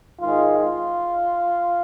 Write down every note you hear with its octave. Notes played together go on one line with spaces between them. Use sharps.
G#2 D#3 G#3 F4
F4